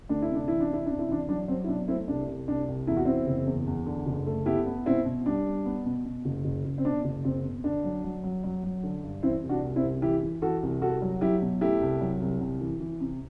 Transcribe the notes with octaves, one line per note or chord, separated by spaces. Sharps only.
D2 D4
E4
C3
D4
E3 E4
D4
C3 E4
C3 D4
E4
E3 D4
F#3 D4
F#3 C4
E4
B2 D4
A3 C4 E4
C2 D4
C2
C2 D4
C2
E2 E4
F#4
E2 C4 E4
F#1
E2
E2
D3
F#1
A3
B3 E4 G4
B3
B2 C4 E4
B2
G3 D4
G3
B3
B2
B2
F#1
F#1
F#1
C4
B2 D4
F#1
F#1 C4
B2
D3 D4
F#3
F#3
F#3
F#3
F#3
D3
G2
E3 C4 E4
C2
D4 F#4
C2
C4 E4
C2
E3 E4 G4
E3
E3 F#4 A4
C2
C2 F#4 A4
F#3
F#3 E4 G4
B2
A3 E4 G4
C2
F#3
C2
C2
E3
E3
C3